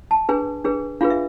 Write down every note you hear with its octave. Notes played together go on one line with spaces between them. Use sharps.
A5
D4 G#4 B4 G#5
D4 G#4 B4
D4 F4 G#4 B4 F5
E5